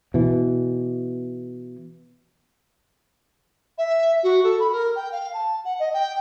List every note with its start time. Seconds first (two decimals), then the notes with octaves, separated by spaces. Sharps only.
0.14 B2 E3
3.78 E5
4.23 F#4
4.44 A4
4.60 B5
4.72 A#4
4.95 G5
5.12 F5
5.33 A5
5.64 F#5
5.79 D#5
5.93 G5